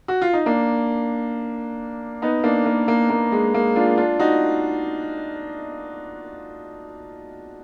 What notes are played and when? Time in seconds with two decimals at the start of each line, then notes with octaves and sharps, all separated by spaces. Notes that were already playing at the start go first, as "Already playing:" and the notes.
0.08 F#4
0.22 F4
0.33 D#4
0.46 A#3 D4
2.22 B3 D#4
2.44 A#3 D4
2.66 A#3
2.88 A#3
3.10 A#3
3.32 G#3
3.54 A#3
3.76 D4 F4
3.98 D4 F4
4.19 D#4 F#4